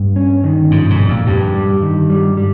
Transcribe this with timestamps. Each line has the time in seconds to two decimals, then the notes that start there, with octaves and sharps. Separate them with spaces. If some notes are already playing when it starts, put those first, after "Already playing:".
Already playing: G2
0.16 C#4
0.44 D#3
0.71 G#2 F3
0.90 G#2
0.99 A#2
1.08 F2
1.27 G2 G4
1.54 G3
1.82 D#3
2.10 G3
2.37 G3